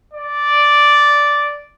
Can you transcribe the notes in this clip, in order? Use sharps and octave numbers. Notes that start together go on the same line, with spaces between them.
D5